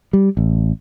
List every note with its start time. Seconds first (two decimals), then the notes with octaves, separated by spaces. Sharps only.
0.13 G3
0.37 A1